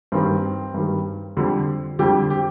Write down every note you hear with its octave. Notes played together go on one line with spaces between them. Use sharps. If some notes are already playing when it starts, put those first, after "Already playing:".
G2 D#3 G3 C4
G2 D#3 G3
F2 D3 G3
F2 D3 G3 G4
G4